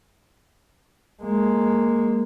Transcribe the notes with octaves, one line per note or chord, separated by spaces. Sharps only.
G#3 A#3